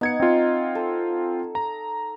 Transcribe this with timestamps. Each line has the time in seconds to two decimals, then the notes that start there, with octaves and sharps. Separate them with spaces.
0.01 B3 D#4 F#5 G#6 C#7
0.20 C4 F4
0.75 A4
1.55 A#5